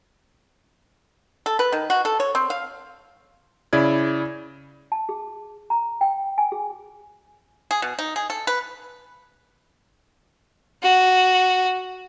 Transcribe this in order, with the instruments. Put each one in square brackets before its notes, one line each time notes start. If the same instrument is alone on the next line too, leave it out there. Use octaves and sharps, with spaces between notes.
[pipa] A4
B4
D#3
F#4
A4
C#5
C4
F5
[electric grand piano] C#3 E4 D5 G#6
[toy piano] A5
G#4
A#5
G5
G#5
G#4
[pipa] G#4
B2
D#4
G#4
A4
B4
[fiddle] F#4